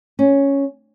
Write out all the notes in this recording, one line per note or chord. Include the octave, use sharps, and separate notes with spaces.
C#4